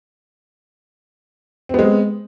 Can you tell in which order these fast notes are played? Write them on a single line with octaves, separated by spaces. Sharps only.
C4 B3 G#3